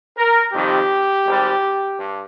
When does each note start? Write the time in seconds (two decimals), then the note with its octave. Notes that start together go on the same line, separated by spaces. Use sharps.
0.18 A#4
0.53 F2 C3 D#3 G3 G4
1.25 G#1 G#2 G3
1.97 G2